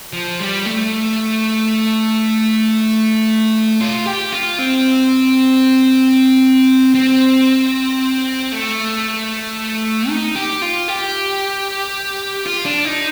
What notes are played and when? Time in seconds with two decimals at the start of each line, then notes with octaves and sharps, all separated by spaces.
0.13 F3
0.40 G3
0.66 A3
3.81 F4
4.06 G4
4.32 F4
4.59 C4
6.95 C4
8.52 A3
10.10 D#4
10.36 G4
10.62 F4
10.88 G4
12.46 F4
12.65 D4
12.85 D#4